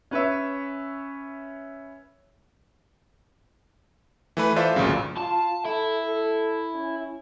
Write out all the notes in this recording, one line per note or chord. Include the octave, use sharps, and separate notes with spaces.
C#4 B4 C#5 E5
E3 A3 B4
F4 A4 C5 D5 E5
G#1 D2 A#2 C#3 F#3
F4 A5
E4 A4
A4
C#4